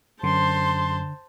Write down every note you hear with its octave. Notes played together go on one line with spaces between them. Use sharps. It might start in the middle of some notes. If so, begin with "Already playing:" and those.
F#2 D3 C5 A5 C6